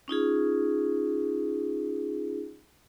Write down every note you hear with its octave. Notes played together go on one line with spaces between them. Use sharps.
C#4 D#4 F4 G#4